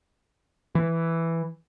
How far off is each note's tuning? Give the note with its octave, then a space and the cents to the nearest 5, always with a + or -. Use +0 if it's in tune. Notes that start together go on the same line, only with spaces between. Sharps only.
E3 +5